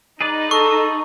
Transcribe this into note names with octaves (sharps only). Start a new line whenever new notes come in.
D#4 G#4 B4 D5
A4 C#6